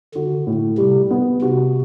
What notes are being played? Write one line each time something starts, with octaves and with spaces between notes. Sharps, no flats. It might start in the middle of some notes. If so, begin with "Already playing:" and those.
D3 F#4
A2
C3 G3
B3
C3 F#4